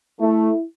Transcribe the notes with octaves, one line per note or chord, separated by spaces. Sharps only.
A3 E4